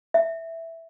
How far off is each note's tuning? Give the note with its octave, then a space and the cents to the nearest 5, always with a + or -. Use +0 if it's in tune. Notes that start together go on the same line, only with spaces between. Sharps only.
E5 +0